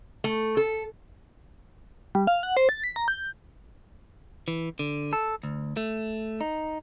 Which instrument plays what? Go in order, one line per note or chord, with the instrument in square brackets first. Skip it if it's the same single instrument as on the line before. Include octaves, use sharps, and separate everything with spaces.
[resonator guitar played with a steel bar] A3
A4
[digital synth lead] G3
F5
F#5
C5
A6
B6
A#5
G6
[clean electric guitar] E3
D3
A4
D2
A3
D#4